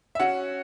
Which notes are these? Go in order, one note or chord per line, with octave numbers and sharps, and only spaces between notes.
E5
C#4 F#4 F#5